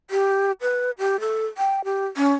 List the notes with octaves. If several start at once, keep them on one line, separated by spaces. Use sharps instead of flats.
G4
B4
G4
A4
G5
G4
C#4